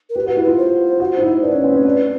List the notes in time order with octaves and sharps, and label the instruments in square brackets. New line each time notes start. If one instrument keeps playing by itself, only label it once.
[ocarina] A#4
[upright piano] G4 [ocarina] B4
[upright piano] F#4
[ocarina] B4
[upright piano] E4
[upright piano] F4 [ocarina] B4
[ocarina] C5
[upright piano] F#4
D#4
E4
[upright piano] D4 [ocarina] B4
[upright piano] C#4
C4
C#4
D4